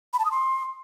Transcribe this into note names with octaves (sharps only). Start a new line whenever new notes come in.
B5
A5
D#6
C6